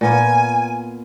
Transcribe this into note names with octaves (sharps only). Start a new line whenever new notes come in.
A#2 B3 F4 G#5